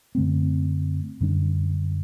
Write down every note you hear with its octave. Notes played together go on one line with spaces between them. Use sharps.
F#2 D3 A3 C4
F#2 D3 G3 D4